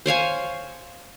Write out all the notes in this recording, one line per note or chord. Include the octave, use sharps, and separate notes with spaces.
C5 C#5 F5 G#5